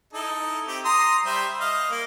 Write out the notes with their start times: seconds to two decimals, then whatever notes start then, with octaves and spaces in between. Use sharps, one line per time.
0.13 D#4 E4 A4
0.67 C4 G4
0.85 A#5 C6 D#6
1.26 G3 C5 E5
1.60 D#5 F5
1.91 A#3